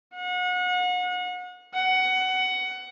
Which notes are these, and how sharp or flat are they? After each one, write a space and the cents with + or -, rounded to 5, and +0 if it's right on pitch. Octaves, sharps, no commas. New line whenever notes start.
F#5 -35
F#5 +15